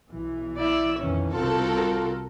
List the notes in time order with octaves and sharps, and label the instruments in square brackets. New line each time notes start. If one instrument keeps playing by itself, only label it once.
[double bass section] B1 E3
[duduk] E4 [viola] D5 E5
[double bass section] F2 B2 D#3 [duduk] E3 [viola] C#4
[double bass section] C2 [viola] C4 F#4 [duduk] F4 [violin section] A4 A#4